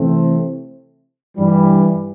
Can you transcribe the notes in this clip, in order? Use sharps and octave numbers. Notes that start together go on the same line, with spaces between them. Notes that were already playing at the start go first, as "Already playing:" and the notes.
Already playing: C3 E3 A3 C4
G2 E3 G3